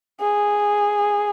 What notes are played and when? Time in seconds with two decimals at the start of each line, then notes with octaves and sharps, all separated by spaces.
0.20 G#4